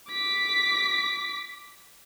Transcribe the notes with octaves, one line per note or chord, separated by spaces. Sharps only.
D6 B6